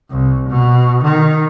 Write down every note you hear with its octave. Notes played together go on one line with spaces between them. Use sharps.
C2
B2
D#3